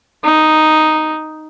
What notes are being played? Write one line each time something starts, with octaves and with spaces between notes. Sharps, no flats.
D#4